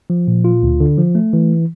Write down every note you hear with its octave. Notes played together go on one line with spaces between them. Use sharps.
F3
A#2
F4
D2
D3
F3
A3
E3